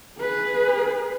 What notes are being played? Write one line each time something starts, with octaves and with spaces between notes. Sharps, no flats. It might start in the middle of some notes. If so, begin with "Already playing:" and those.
G#4 B4